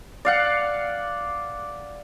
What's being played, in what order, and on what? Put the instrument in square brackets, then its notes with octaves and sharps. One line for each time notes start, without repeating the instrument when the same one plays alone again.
[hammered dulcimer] D5 F5 F#5